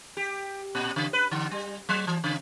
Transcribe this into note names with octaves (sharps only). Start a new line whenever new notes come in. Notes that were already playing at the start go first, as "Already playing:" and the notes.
G4
A#2
C#3
B4
D3
G3
F#3
E3
C#3